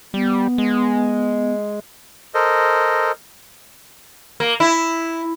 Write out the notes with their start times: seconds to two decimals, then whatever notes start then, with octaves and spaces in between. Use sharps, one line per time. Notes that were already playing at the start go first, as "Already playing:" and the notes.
0.14 G3 B3
0.58 G#3
2.34 A4 A#4 C5 D#5
4.40 A#3
4.60 E4